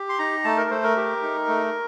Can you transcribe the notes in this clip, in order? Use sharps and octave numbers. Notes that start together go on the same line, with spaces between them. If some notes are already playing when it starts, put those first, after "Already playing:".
Already playing: G4
C6
D#4 A#5
A3 A5
A#4
A3 C5
A#4
G4
D#4
A3